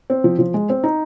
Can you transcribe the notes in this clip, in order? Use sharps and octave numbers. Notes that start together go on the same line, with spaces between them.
C4
F3
F3
G#3
C4
D#4